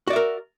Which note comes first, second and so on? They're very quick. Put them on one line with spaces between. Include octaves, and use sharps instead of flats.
F#4 D5 E5 A#4